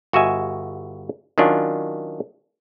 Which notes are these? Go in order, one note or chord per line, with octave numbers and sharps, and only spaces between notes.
G1 F#4 D#5 E5 G#5
D#3 F#3 C#4 D4 F4